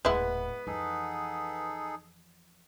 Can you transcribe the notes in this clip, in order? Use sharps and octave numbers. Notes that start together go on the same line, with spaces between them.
D#1 A2 G#3 B3 E4 B4 F#5
F2 E3 D#4 G#4 A4